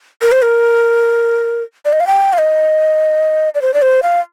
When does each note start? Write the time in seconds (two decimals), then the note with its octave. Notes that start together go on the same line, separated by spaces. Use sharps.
0.22 A#4
0.32 C5
0.42 A#4
1.85 D5
1.93 D#5
2.00 F5
2.07 G5
2.33 F5
2.38 D#5
3.55 D5
3.62 C5
3.74 D5
3.82 C5
4.03 F5